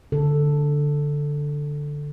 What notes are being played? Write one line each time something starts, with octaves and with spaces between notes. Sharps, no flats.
D3 A4